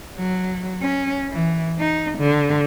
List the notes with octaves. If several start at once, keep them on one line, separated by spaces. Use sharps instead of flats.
F#3
C#4
E3
D#4
D3